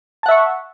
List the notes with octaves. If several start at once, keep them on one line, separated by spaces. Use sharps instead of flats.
E5 F#5 A5 C#6